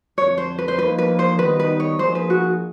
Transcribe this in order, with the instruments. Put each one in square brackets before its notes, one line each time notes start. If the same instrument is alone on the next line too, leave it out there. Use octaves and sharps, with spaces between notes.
[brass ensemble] F2 D3 F3 [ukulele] C#5
[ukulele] C5
B4
C5
[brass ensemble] F3 A#3 D#4 [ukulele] B4
[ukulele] B4
C5
[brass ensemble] D#3 G3 B3 D#4 [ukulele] B4
[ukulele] B4
C#5
[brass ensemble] F3 A#3 D#4 G#4 [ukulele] C5
[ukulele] B4
F#4